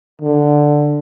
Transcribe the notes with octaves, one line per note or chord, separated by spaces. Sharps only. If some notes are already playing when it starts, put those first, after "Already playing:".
D3